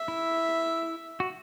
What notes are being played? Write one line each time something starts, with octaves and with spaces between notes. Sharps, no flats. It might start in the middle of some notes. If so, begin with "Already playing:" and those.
Already playing: E5
E4
F#4